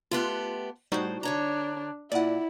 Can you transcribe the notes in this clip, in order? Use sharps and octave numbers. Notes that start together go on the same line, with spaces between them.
A3 B3 F4 G4 C6 F#6
A2 G3 D#4 F#4 C5
D3 D4 C#5 A#5
A#2 E4 D5 F#5